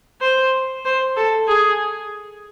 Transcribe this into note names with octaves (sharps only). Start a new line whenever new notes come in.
C5
C5
A4
G#4